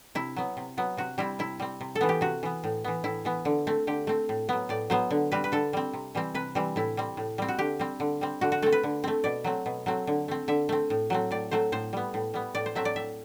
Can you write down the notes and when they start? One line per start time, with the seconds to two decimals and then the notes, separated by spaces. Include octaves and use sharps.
0.15 C3 E4
0.36 F#3 B3
0.57 C3
0.77 F#3 B3
0.97 C3 F#4
1.18 G3 C4 E4
1.39 C3 E4
1.59 G3 C4
1.81 C3
1.95 A4
2.01 E3 B3
2.09 G4
2.21 C3 F#4
2.43 E3 B3
2.64 A2
2.84 E3 B3
3.04 A2 E4
3.25 E3 B3
3.45 D3
3.67 A3 C4
3.87 D3 G4
4.07 A3 C4
4.29 A2
4.49 F#3 B3
4.69 A2 D5
4.90 F#3 B3 C5
5.11 D3
5.32 G3 C4 B4
5.44 B4
5.52 D3 A4
5.73 G3 C4
5.93 C3
6.15 E3 G3 C4
6.34 C3 B4
6.55 E3 G3 C4
6.76 A2 E4
6.97 G3 C4
7.17 A2
7.38 G3 C4
7.48 F#4
7.59 D3 G4
7.80 G3 C4
8.00 D3
8.21 G3 C4
8.41 D3 F#4
8.52 F#4
8.62 A3 C4 A4
8.72 B4
8.83 D3
9.04 A3 C4
9.24 B2 D5
9.44 F#3 A3 C4
9.66 B2
9.86 F#3 A3 C4
10.07 D3
10.28 A3 C4
10.48 D3 E5
10.69 A3 C4
10.90 A2
11.10 F#3 A3 C4
11.31 A2 D5
11.51 F#3 A3 C4 C5
11.72 A2 C5
11.93 G3 B3
12.14 A2
12.34 G3 B3
12.55 A2 D5
12.66 C5
12.75 F#3 A3 C4 E5
12.85 D5
12.96 A2 E5